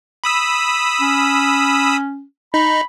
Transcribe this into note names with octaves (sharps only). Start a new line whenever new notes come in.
B5 D#6 E6
C#4
D#4 B5